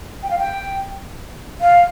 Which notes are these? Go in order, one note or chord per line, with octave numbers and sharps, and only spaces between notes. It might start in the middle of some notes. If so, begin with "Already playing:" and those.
G5
F5
G5
F5